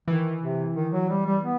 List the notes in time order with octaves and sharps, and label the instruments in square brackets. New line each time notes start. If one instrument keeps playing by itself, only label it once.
[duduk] D#3 [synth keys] E3
[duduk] C3
D#3
F#3
G3
G3
B3